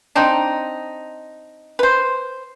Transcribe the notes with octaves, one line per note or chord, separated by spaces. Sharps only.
C4 D4 D#4
B4 C5